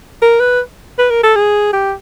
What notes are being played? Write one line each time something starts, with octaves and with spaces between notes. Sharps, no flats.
A#4
B4
B4
A#4
A4
G#4
G4